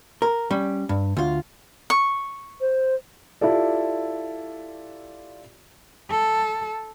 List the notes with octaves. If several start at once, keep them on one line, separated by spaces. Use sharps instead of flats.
A#4
G3 C#4
G2
D2 F4
C#6
C5
E4 F4 G4 A4 D5
A4